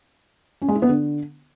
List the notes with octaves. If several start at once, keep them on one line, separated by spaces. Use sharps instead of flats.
C#4
G#3
E4
B3
D3